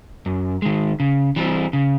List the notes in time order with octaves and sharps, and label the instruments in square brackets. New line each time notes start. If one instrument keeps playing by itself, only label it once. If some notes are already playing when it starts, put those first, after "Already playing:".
[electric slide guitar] F#2
D#3 G#3
C#3
E3 G3 C4
C#3